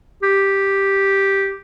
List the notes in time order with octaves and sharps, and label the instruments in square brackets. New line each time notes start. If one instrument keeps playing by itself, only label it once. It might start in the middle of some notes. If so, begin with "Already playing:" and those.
[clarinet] G4